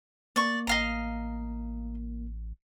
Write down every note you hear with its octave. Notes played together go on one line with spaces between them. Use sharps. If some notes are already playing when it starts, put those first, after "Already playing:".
A#3 D5 C#6
A1 D#5 F5 A#5